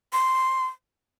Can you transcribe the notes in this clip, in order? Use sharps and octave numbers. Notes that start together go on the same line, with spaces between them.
C6